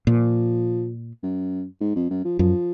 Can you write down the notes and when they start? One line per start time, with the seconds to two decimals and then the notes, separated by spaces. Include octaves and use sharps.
0.07 A#2 F3
1.23 F#2
1.81 G#2
1.96 F2
2.10 F#2
2.25 F3
2.39 F#2 F3